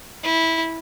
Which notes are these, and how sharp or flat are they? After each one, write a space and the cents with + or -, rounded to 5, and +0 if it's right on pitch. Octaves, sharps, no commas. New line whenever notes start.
E4 -15